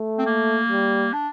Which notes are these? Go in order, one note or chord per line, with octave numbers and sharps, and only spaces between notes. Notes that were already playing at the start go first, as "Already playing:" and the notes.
Already playing: A3
C4
A#3
G3
D4